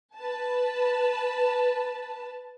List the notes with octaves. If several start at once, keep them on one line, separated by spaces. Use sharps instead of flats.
B4 A5